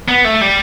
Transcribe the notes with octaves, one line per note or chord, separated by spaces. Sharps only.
B3
A3
G3